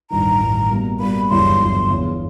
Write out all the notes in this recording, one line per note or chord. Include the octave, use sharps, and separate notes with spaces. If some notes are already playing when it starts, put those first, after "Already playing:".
A1 G2 D#3 A#5
A1 G2 D#3
B2 G3 A#3
B2 G3 A#3 B5
G1 F#2 C#3 E3 G3 C6
G1 F#2 C#3 E3 G3
E2 C#3 E3